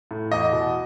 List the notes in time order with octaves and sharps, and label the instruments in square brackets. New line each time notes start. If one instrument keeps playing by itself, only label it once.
[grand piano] A2
E2 D#5
B2